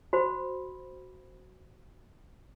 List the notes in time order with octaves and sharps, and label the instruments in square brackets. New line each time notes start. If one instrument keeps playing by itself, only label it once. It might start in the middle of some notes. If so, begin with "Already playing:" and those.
[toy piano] F#4 C5 B5